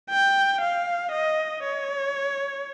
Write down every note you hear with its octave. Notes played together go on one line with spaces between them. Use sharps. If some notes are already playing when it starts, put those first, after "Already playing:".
G5
F5
D#5
C#5